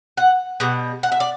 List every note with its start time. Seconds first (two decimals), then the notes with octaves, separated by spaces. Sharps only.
0.17 F#5
0.60 B2 G3 F#5
1.03 F#5
1.12 E5
1.20 D5